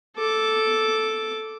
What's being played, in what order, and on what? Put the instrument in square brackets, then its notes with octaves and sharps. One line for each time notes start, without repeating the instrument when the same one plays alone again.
[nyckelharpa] A4 D6